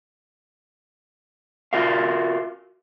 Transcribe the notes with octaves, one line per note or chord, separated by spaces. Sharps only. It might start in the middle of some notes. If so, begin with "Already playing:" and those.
F4 F#4 A#4 E5 F5